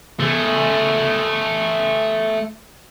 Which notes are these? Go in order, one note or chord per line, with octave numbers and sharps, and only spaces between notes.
A3 G#4